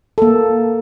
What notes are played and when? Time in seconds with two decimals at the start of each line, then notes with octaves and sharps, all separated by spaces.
0.18 A#3 A4